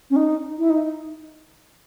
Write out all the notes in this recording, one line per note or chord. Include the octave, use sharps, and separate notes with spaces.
C#4
D#4
E4
D#4